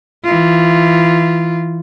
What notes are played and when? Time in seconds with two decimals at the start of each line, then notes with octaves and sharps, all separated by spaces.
0.24 E3 F4